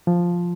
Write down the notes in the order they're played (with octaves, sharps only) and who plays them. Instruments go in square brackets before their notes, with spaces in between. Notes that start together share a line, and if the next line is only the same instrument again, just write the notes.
[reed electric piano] F3